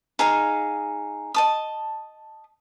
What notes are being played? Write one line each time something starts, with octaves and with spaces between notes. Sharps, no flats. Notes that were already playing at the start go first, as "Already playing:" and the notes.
D#4 G#4 F5 A#5
D#5 A5 D#6